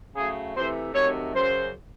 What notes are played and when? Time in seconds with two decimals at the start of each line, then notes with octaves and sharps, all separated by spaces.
0.16 C#3 F#3 A3 G#4
0.56 C3 E3 A3 C5
0.94 C3 D#3 F#3 A3 C#5
1.34 F#2 C#3 F#3 C5